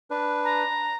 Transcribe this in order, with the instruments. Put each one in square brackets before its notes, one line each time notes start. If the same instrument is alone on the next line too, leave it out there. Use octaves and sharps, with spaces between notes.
[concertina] D4 B4
[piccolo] A#5